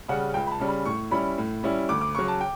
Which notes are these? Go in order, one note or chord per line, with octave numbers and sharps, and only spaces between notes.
C#3 G3 C#4 F#5
C#2 G5
B5
A5
C#3 G3 C#4
B5
A2 C#6
G3 C#4 E4 B5
A2
G3 C#4 E4
D2 D6
D6
C#3 F#3 C#6
A5
G5